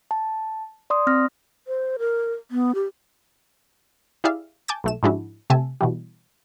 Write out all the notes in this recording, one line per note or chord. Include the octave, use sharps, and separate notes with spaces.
A5
D5 C6 D#6
C4 F6 A#6
C5
A#4
B3
G4
E4 G4 G#4 D5 E5 F5
G#5 A5 D6 G6 A6
B1 A3 E7
G#2 F3 G#3 D4 E4 F#4
C3 A3 E5 G#5 A5
B2 E3 G3